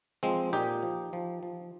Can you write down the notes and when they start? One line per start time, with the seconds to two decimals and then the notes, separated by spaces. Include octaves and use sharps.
0.23 F3 G#3 C4
0.53 A#2 D#4 G4
0.83 F3
1.13 F3
1.43 F3